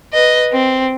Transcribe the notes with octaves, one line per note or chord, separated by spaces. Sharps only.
B4 D#5
C4